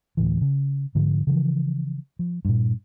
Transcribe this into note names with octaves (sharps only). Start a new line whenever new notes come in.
D2 A2 E3
C#3
G#2 D3 F3
C#3 E3 F3
F3
G2 A#2